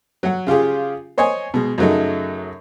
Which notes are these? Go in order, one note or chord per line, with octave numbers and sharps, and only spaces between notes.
F#3 F#5
C#3 F4 G4 G#4
C5 C#5 D#5 G#5 C#6
B2 G#3
F#2 C#3 F#3 A3 D#4